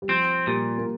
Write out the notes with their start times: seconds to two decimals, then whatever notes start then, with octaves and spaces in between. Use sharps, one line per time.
0.02 G3
0.08 F3 C4
0.47 A#2 G3
0.78 A#3